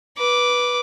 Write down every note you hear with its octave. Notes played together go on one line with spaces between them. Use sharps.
B4 D6